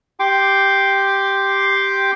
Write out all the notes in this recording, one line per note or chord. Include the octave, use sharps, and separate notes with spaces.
G4 G5 C6 D6